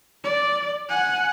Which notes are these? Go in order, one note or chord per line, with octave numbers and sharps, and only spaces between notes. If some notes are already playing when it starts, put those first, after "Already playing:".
D5
F#5 G#5